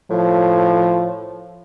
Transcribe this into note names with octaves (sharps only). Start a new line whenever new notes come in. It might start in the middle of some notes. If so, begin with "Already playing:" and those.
A2 F3